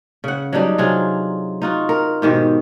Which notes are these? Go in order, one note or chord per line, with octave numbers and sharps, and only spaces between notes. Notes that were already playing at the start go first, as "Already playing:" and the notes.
C#3 F#5
F#3 G3 D4 D#4
C3 F#3 F4 G#4
D#4 F4 F#4
A#4
G#2 B2 D#3 G4